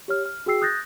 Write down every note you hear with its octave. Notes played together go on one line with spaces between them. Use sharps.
G4 C#5 F6
F6
F#4 G#4 G5 E6 C7
D#6 F#6 G6 A6 A#6